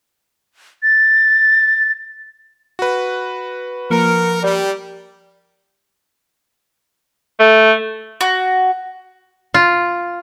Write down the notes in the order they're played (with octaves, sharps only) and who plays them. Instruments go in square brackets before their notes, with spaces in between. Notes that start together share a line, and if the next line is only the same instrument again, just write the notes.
[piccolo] A6
[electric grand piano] F#4 B4
[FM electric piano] F3 A#3 C#7 [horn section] A#4
[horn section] G3
[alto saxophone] A3
[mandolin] F#4
[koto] F4